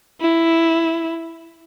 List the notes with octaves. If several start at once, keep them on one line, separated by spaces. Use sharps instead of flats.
E4